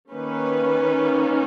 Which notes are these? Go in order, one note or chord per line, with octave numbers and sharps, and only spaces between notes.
D#3 A#3 C#4 B4